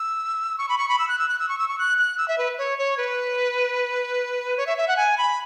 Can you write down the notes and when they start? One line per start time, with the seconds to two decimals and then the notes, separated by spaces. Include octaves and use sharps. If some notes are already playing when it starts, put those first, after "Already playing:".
Already playing: E6
0.58 C#6
0.69 B5
0.78 C#6
0.89 B5
0.99 E6
1.08 F#6
1.19 E6
1.29 F#6
1.39 E6
1.49 C#6
1.59 E6
1.68 C#6
1.78 F#6
1.98 F#6
2.18 E6
2.28 E5
2.38 B4
2.58 C#5
2.79 C#5
2.98 B4
4.57 C#5
4.67 E5
4.78 E5
4.88 F#5
4.97 G#5
5.18 B5